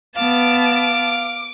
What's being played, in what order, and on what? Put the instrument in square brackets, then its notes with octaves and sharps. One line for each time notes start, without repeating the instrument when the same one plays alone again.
[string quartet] B3 A5 [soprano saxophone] F5 [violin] D6 D7